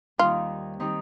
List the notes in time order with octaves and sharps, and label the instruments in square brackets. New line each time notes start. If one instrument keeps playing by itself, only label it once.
[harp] D#2 D#3 G3 C4 D#4 [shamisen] F4
[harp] D#3 G3 C4 D#4